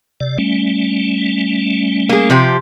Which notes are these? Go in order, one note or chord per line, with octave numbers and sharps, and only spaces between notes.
C3 D5
G3 A3 C#4
A#3 G#4
C3 F3 G4